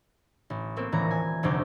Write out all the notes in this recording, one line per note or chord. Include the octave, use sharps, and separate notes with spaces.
A1
A3 A#3 C4
D#1 A1 E3 A#5
G#5
F1 D2 C3 D6 G6